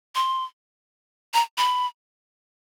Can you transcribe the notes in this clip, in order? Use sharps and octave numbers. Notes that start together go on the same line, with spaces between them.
C6
A#5
B5